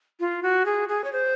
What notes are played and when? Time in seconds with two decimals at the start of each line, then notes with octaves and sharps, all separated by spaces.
0.20 F4
0.43 F#4
0.65 G#4
0.89 G#4
1.04 C#5
1.13 C5